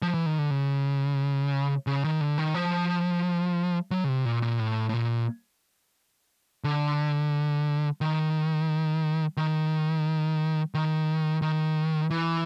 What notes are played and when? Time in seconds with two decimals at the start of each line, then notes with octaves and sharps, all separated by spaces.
0.02 F3
0.14 E3
0.26 D#3
0.39 D3
0.50 C#3
1.87 C#3
2.04 D#3
2.21 D3
2.38 D#3
2.54 F3
3.91 F#3
4.04 C#3
4.08 C3
4.25 A#2
4.42 A#2
4.60 A2
4.89 A2
4.94 A#2
6.64 D3
8.01 D#3
9.37 D#3
10.74 D#3
11.42 D#3
12.11 E3